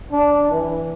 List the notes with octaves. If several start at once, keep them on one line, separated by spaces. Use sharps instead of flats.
D4
E3